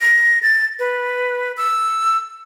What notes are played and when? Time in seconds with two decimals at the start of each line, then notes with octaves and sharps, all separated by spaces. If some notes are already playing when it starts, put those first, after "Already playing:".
0.01 A#6
0.43 A6
0.79 B4
1.57 E6